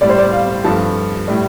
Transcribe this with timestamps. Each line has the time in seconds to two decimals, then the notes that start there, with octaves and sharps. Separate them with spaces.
0.01 A2 G3 D5
0.09 C5
0.18 D5
0.32 F5
0.64 G2 F3 A3 A5
1.28 A2 G3